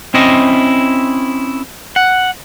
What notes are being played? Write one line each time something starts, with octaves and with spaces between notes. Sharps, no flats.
C4 C#4 E4 D#5
F#5